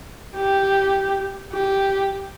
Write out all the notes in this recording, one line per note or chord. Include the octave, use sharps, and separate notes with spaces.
G4
G4